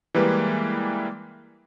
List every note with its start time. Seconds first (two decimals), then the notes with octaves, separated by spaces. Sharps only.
0.14 E3 G3 G#3 A#3 G4 B4